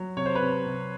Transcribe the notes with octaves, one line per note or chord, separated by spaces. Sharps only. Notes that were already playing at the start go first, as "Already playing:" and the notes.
Already playing: F#3
C3 C#5
C5
B4 C#5
C3
C3